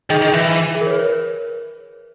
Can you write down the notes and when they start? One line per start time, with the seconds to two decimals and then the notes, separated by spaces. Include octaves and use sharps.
0.10 D#3 G#4
0.22 D#3
0.34 E3
0.75 G#4
0.81 A#4
0.87 C#5
0.90 B4
0.99 C#5